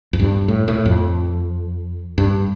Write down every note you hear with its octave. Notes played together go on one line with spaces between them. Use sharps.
F2
G2
A2
A2
F2
G2